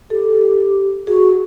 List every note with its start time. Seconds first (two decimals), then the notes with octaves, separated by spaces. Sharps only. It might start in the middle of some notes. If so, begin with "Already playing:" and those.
0.10 G4 A4
1.07 F#4 G#4